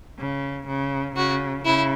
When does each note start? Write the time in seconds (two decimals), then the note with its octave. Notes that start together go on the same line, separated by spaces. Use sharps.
0.19 C#3
0.67 C#3
1.16 C#3 F#4
1.65 C#3 E4